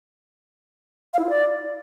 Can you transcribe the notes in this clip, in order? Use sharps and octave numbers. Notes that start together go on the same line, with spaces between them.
F5
E4
F4
D5